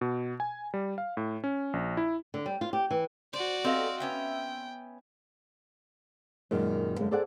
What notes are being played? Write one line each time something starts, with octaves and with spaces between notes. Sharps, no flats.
B2
G#5
G3
F5
A2
C#4
A#1
E4
D3
G3
F4
G4
E3
F#4 C5 D5
B3 C4 G4 A4 D#5 F5
B3 C#4 E5 G5
F#2 A#2 D#3 G#3
F#2 D3 G#3 A#3
G#4 A4 C5 D5 E5 F#5